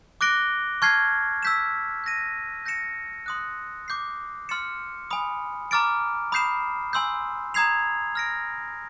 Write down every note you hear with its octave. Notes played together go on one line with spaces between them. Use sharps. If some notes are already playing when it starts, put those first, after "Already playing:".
D6 F#6 A#6 D7 G7
A5 C#6 F6 G#6 C7
E6 G6 B6 E7
G6 A#6 D#7
G6 A#6 C#7 E7
C6 D#6 F#6
D6 G6 C7
C6 F6 A6 C#7 E7
G#5 B5 D#6
A#5 D6 F6 A6 D7
B5 D#6 G6 C7 E7
G#5 C6 E6 G6
A#5 D#6 G#6 C7 F7
F6 A#6 D7